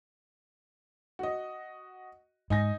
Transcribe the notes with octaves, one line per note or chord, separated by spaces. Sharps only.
F#4 D#5
G#2 D#4 G#5 A#6